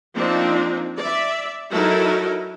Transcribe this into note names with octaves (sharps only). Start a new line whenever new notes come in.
F3 A#3 C4 D4 D#4
D5 E5
F#3 D#4 E4 F#4 A4 A#4